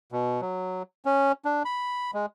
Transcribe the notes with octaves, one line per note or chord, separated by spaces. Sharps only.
B2
F#3
C#4
D4
B5
G#3